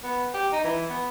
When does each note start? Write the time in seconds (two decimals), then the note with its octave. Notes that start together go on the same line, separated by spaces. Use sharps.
0.04 B3
0.34 G4
0.52 D#4
0.64 E3
0.90 B3